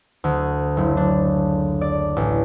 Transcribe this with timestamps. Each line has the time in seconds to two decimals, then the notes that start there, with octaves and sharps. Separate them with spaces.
0.24 D2
0.77 F#1
0.97 D4
1.81 D5
2.16 A1